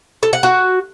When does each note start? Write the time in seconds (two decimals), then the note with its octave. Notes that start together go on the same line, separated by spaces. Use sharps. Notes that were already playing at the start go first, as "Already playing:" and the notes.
0.23 A4
0.33 F#5
0.43 F#4